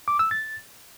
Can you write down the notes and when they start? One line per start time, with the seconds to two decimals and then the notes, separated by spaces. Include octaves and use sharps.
0.08 D6
0.19 E6
0.31 A6